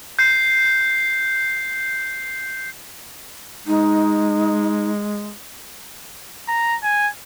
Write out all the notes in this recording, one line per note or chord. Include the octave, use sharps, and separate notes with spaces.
G6 C7
G#3 D#4
A#5
G#5